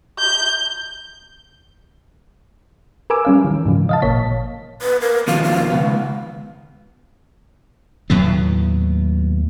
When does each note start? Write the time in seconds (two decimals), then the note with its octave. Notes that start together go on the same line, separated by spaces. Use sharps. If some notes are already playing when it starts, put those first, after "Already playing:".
0.19 G6
3.10 A#4 B4 G#5 D6 E6
3.25 G3 C#4 F5
3.45 D#3 E3
3.66 G#2 C#3 F3
3.89 D#5 F5 A5
4.02 G#1 A#2 A#3 C#5 B6
4.82 B4
5.01 A#4
5.27 D#2 B2 F3 F5
5.44 F5
5.71 C#2 B3
8.10 D#2 A2 F#3 B3